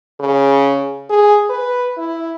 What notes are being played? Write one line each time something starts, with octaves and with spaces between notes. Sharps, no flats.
C#3
G#4
B4
E4